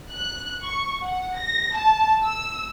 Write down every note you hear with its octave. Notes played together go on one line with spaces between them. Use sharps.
F#6
C#6
F#5
A#6
A5
E6